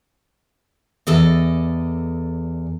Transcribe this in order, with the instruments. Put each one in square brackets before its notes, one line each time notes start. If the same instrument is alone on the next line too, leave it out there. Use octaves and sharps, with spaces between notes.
[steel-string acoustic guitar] E2 A4 D5 D#5